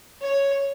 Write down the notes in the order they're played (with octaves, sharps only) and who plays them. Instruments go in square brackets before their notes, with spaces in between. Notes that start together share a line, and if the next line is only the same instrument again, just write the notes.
[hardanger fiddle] C#5